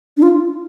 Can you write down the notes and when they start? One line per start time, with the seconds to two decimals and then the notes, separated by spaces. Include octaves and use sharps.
0.17 D4
0.22 F4